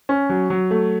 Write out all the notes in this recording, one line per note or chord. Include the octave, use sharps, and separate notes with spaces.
C#4
F#3
F#3
A3